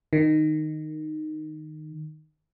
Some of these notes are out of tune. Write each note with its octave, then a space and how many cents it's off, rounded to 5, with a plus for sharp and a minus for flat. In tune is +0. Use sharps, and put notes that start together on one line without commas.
D#3 -10